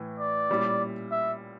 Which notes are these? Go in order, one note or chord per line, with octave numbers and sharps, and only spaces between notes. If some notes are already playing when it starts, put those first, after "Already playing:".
Already playing: A2 E3
D5
A#2 G3 C#4 E4
E5